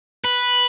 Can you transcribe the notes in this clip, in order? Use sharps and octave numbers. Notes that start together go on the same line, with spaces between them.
B4